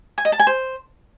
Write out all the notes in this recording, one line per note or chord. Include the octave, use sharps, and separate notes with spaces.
G#5
D#5
A5
G#5
C5